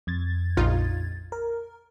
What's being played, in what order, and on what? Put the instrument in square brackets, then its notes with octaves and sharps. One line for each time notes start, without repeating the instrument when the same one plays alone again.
[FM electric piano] F2 G#6 A6
[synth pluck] A#1 D#4 F4
[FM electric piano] A#4